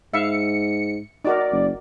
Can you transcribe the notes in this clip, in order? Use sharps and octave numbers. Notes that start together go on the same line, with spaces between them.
G#2 E5 F5 C#7
D#4 F#4 A#4 D5
F#1